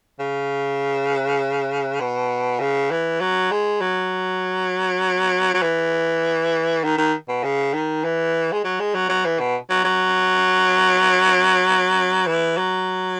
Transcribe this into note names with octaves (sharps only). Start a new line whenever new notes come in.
C#3
B2
C#3
E3
F#3
G#3
F#3
F#3
E3
D#3
D#3
B2
C#3
D#3
E3
G#3
F#3
G#3
F#3
F#3
E3
B2
F#3
F#3
E3
F#3